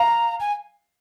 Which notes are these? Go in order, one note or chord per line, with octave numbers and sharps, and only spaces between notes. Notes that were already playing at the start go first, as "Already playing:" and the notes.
Already playing: F5 A#5
G#5